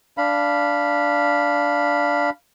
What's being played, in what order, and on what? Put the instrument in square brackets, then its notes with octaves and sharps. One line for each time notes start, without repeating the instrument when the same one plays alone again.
[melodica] D4 F5 B5